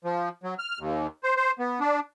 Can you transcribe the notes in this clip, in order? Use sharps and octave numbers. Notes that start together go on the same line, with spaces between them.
F3
F#3
F6
D#2
C5
C5
B3
D4